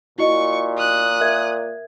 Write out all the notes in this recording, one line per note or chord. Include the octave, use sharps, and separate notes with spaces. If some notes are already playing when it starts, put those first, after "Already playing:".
A#2 E4 F#4 D#5 C#6
D#6 F#6
A#4 E5 G#6